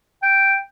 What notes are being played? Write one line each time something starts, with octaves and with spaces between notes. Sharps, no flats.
G5